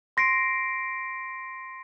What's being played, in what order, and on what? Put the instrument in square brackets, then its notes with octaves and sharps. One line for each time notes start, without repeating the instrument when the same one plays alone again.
[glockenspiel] C6 A#6 C7 D7